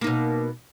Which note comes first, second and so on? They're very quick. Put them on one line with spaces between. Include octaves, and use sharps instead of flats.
A#3 D#4 B2